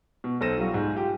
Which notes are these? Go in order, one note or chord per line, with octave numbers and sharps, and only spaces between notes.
B2
B1 A4 C5 A#6 D#7 E7
F#3 G3 F4 F#4
G#2
F4 G4